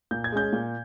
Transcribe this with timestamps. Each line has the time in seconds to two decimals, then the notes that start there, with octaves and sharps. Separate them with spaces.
0.11 A#2 G6
0.24 G#6
0.32 G#3 C#4 G6
0.53 A#2